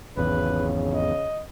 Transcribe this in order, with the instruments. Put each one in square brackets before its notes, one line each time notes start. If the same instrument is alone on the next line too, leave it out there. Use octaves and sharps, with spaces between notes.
[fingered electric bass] G#1 E2 [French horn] C#3 [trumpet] B4
[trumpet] D#5